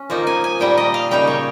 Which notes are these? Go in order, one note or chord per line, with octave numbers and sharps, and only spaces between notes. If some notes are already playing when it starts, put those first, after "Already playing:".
Already playing: C#4
F3 A#3 D#4
G#5
G#5
A#2 G3 A#3 G5
D#5
F5
C#3 G3 A#3 D#4 G5
C#5